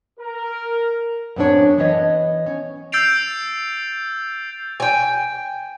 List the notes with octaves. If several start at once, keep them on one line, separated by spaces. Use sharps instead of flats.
A#4
F#2 A2 B3 C4 D4 C#5
E3 B3 C#5 D#5
C#4
E6 G6 A6 C7 D7 F7
G5 G#5